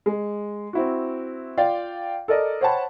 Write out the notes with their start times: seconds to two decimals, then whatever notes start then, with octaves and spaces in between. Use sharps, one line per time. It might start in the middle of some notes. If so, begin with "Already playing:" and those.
0.06 G#3
0.73 C4 E4 F#4
1.57 F4 D5 F5 G5
2.28 A4 A#4 D5 D#5
2.61 C5 C#5 F#5 G5 A5 B5